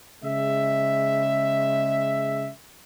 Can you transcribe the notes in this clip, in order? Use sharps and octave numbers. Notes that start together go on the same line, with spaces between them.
C#3 G#3 E5